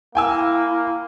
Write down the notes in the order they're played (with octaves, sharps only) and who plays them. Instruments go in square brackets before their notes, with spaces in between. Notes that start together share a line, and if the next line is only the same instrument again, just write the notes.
[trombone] A#3 [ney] E4 [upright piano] G5 G#5 E6